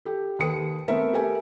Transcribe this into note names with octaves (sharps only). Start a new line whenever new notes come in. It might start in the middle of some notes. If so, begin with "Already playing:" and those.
G4 A4
D#2 A4 B4 D#6 C#7
A3 B3 C4 A#4 E5
G4 A4 A#4 E5 G#5